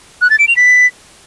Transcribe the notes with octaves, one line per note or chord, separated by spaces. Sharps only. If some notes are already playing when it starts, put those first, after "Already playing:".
F#6
A6
D7
F7
B6